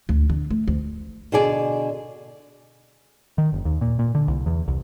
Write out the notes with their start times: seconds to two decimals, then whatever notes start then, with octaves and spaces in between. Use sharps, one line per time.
0.09 D2
0.30 D3
0.50 A3
0.67 D2
1.32 B2 D3 G#4 D5 G#5
3.38 D#3
3.53 F#1
3.65 D#2
3.81 A#2
3.99 A#2
4.15 D3
4.28 C2
4.46 E2
4.68 C2